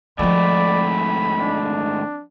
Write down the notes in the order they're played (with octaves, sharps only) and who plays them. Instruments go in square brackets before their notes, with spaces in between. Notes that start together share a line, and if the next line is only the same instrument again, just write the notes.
[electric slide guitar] G#2 D#3 A3 [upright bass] F3 C4 [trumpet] D5 [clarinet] B5
[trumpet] D4